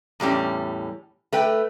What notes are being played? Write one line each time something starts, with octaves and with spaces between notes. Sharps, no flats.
E2 A2 G3 C#4
A3 B4 G5